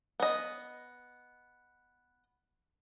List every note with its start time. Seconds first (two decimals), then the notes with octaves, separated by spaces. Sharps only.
0.20 B3 D#5